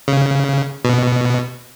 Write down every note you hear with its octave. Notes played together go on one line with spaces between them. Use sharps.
C#3
B2